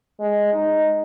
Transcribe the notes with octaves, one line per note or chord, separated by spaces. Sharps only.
G#3
D#4